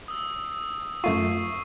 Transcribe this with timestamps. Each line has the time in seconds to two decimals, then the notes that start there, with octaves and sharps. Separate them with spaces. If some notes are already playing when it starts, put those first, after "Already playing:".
0.08 D#6 E6
1.04 F#2 A3 F4 C#6 C7 D#7